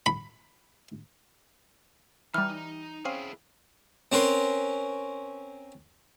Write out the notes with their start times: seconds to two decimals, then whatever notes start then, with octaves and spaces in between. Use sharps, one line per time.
0.06 B5
2.34 E3 G3 D#4 A#5 F6
3.05 C4 C#4 E4 G#4 F5
4.12 C4 C#4 A#4 B4 C6